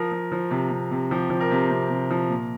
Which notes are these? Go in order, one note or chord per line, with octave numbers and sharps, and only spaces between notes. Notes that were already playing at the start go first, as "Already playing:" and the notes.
Already playing: F3 A#4
F3
F3
C3
C3
C3
F3 G4
F3
A#4
C3
C3
C3
F3
A#2